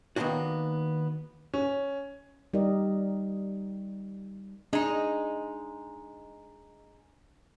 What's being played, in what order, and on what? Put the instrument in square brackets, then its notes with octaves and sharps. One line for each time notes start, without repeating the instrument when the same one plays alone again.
[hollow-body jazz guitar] D#3 A#3 B3 C#4 D4 F#4
[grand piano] C#4
[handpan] G3 D#4 G4 A#4 D5 D#5
[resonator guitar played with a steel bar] G#3 D#4 [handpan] D4